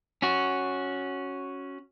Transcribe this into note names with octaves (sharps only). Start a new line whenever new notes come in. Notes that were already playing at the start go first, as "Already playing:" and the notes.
C#4 F#4